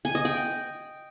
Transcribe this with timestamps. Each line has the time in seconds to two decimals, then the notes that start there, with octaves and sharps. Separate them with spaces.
0.05 G#5
0.15 D#5
0.25 G5